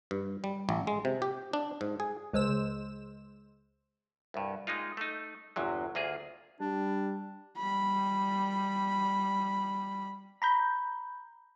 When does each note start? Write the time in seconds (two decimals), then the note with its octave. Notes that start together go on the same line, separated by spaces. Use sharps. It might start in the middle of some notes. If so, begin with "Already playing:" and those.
0.11 G2
0.44 G3
0.69 A1
0.87 G#3
1.05 C3
1.22 G4
1.53 D4
1.81 G#2
2.00 G#4
2.33 C#2 G#3 C5 E6 E7
4.34 C2 G2
4.67 G#3 A#3 D#4 F4
4.97 A3 D#4
5.56 G1 E2 C3 F#3
5.95 D2 A#3 F4 G#4
6.61 G3 D4
7.57 G3 B5
10.42 A#5 B5 G6